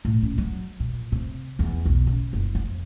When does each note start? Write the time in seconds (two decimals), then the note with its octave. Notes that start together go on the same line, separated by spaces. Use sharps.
0.05 A2
0.22 C#4
0.38 F#3
0.80 A#2
1.12 C3
1.59 E2
1.86 B1
2.07 C#3
2.33 F#1
2.55 F2